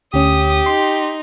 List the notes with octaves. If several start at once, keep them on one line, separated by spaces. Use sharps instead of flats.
D2 C#4 G4 D#6
D#4 C6